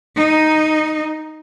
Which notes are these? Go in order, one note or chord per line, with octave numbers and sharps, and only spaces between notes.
D#4